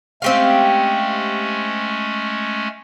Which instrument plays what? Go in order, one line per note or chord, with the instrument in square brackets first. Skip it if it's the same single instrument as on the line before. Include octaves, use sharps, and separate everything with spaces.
[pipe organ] G#3 A3 C#4 [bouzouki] C4 G4 F5